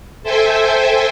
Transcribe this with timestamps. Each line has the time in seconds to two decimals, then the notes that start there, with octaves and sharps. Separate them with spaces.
0.23 A4 C5 E5 G5 G#5